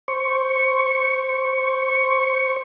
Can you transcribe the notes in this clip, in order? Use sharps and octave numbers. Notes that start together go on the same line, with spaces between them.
C5 C#6